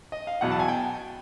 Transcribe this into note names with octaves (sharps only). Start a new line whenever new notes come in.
D#5
F5
E2 B2 F#3 F#5
A5
G#5
G5